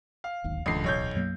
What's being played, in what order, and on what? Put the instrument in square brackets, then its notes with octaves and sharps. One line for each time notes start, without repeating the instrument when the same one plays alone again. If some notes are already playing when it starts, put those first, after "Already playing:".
[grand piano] F5
[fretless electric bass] D1 G#1 D#2
[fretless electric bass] D1 E3 [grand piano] C#2 D3 C7
[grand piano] B1 C#5 G6
[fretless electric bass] F#2 F#3 A#3